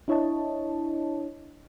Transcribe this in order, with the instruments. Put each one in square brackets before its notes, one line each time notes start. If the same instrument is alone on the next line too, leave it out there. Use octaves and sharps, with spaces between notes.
[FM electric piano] D4 E4 C#5 D#5 A5